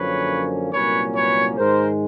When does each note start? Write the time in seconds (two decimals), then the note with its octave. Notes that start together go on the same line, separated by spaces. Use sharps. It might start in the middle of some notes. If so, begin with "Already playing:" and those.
Already playing: F#2 D3 F3 A#3 C#4 B4 C#5
0.72 C2 A#2 F#3 A#3 C#4 B4 C#5
1.14 B4 C#5
1.56 G#2 D#3 G#3 A#4 C5